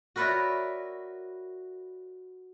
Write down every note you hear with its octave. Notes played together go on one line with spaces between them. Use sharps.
F#4 A#4 B4 C#5 D5 E5